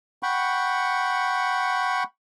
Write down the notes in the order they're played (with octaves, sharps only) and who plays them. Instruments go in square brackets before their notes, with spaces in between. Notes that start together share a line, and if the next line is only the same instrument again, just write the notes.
[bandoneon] F#5 G5 B5 C#6